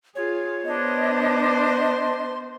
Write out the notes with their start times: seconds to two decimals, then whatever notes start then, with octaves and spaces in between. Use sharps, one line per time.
0.15 F4 G#4 C#5
0.65 B3 D4 C5 D#5
1.42 C6